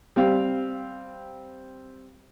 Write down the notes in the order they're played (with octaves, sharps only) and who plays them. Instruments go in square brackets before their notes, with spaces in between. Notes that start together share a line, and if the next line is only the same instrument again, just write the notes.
[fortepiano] G3 C4 F5